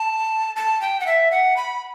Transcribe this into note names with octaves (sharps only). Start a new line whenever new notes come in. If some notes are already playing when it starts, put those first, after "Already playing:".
Already playing: A5
A5
G5
F#5
E5
F#5
B5